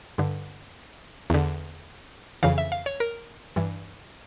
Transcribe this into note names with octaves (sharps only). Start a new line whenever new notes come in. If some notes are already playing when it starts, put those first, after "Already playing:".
G2 D3
E2 D3
F2 C#3 E3 F5
E5
F5
C#5
A#4
G2 E3